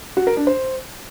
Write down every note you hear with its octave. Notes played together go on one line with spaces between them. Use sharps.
F#4
A#4
D4
C5